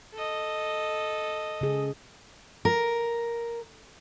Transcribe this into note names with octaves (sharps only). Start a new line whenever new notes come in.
A4 D#5
C#3 G#4
A#4